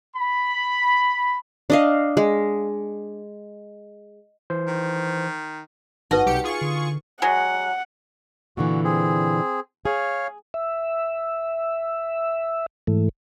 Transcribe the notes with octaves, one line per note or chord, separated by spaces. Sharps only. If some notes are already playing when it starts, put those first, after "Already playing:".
B5
D4 D#5 F5
G#3
E3 C5
D#3
G#1 D#4 F#4 B4 D#5
C2 G4 C#7
F4 G#4 C#6
D3
F#3 G#3 F#5
A#2 D3 E3 F#4
C4 G#4
G#4 C#5 F5
E5
G#2 E3 A3